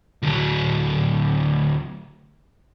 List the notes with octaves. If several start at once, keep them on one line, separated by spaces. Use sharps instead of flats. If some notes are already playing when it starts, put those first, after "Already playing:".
D2 F#3